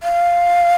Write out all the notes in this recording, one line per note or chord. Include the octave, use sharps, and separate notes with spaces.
F5